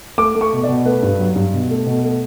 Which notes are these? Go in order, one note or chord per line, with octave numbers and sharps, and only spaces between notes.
A3 D6
A3
C#6
B2
D5
B2
A3 B4
G2
F#3
G2
B2
A3
B2
A3